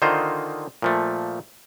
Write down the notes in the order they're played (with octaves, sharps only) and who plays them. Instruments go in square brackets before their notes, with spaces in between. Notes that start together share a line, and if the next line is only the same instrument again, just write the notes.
[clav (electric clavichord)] D3 D#3 D#4 F4 C5
A#2 F3 A3